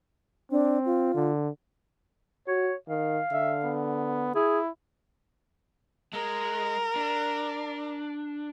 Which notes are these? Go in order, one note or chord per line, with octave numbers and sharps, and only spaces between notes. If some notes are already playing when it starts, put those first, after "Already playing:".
C4 D4
F4
D3
F#4 C#5
D#3 F5
D3 E5
B3
E4 G#4
G#3 A#4
D4